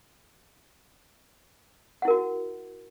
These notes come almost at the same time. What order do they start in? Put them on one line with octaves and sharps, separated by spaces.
F#5 E4 A#4 F#4